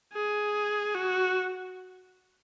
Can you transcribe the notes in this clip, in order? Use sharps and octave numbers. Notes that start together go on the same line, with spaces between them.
G#4
F#4